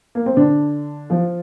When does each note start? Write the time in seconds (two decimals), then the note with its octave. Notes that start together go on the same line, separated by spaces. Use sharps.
0.15 A#3
0.26 C4
0.37 D3 D4
1.10 F3 F4